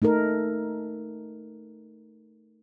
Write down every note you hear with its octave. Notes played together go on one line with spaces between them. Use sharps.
A3 D#4 A4 A#4